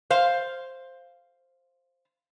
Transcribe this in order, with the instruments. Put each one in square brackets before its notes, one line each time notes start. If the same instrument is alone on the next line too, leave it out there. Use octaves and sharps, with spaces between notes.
[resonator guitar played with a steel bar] C5 F5